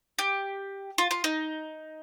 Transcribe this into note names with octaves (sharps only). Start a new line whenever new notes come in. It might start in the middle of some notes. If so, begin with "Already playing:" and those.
G4
F4
F4
D#4